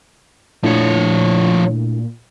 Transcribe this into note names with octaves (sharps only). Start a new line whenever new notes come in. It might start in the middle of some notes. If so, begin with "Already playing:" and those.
A#2 F3 A3 D4 E4 C#5